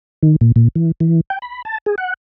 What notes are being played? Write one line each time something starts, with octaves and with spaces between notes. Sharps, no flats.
D#3
A#2
A#2
E3
E3
G5
B5
A5
G#4
F#5